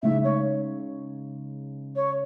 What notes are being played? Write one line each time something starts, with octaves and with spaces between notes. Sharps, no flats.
C#3 G#3 D#4 E5
C#5
C#5